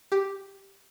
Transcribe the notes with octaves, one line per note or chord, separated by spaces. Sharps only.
G4